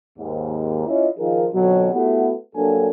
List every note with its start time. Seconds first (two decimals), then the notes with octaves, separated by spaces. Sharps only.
0.19 D#2 G#2
0.87 C#4 E4 F4 C#5 D#5
1.18 D#3 F3 D#4 F4 G#4 A#4
1.53 F2 B2 D3 F#3
1.92 A3 B3 E4 F#4 G4
2.55 G2 F#3 A#3 D4 A4 G#5